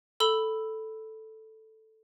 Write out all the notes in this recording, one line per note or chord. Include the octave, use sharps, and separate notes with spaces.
A4 B5 E6 G7